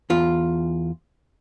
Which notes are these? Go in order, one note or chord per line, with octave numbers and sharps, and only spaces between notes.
E2 F4